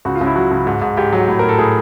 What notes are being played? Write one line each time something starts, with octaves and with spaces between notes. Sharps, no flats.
C#2 F#4
F4
C#2
E4
F#3 F#4
C#2
G#2
G#2
G#2 G4
F#3
A2
A2 A#4
A4
A2 G#4